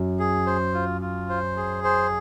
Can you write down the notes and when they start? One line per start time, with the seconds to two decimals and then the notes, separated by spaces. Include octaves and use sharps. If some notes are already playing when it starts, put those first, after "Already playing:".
Already playing: F#2
0.19 G#4
0.47 C5
0.74 F4
1.01 F4
1.29 C5
1.57 G#4
1.84 C5